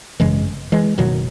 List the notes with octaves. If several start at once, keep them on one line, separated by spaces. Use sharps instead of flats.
G#1 F#2 C#3 E3 G#3
E3 G#3
F#1 E2 B2 D#3 F#3